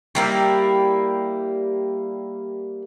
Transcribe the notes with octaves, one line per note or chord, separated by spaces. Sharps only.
G3 A#3 E4